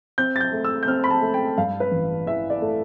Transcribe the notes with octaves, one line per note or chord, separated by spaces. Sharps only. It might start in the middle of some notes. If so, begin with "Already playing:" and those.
C4 G6
A6
G6
A3
E6
G6
C4 F6
B5
A5
A3
G5
G2 F5
B4
A1
E3 E5
D5
A3